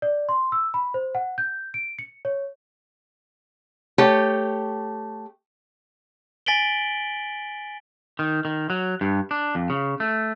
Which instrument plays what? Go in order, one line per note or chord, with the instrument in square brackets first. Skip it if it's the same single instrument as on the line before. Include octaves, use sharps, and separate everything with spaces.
[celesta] D5
C6
E6
B5
C5
F#5
G6
D7
C#7
C#5
[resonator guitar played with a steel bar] A3 G4 C#5
[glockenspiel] G#5 A6 B6 D7 F#7 G7
[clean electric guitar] D#3
D#3
F#3
G2
D4
F2
C#3
A3